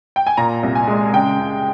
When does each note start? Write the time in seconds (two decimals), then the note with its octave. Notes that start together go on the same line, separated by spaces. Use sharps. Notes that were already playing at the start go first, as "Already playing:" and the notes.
0.16 G5
0.27 G#5
0.37 A#2 A#5
0.63 C2
0.75 G#5
0.88 G#3
1.13 C#3 G5
1.39 C#2